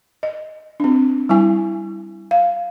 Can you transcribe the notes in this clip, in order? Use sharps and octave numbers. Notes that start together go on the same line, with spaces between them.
D#5
C4 D4
G3 E4 G#5
F5